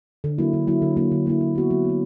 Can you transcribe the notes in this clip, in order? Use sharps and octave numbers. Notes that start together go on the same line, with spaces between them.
D3
F#3 A#3 E4
D3
F#3 A#3 E4
D3
F#3 A#3 E4
D3
F#3 A#3 E4
F#3
B3 F#4
F#3
B3 F#4